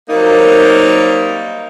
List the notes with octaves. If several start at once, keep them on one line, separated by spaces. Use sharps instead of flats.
F#3 G3 A#3 C4 D#4 A#4